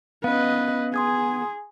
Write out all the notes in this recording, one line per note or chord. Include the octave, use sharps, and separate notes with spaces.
B3 C#4 B4 D#5 F5
G#4 C6 D#6 G#6